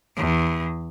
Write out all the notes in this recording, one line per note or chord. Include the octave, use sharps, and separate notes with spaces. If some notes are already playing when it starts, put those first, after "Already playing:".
E2